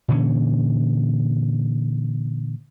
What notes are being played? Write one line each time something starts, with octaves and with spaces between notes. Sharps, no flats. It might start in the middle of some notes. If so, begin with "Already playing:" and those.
A#2 D3 E3 C#4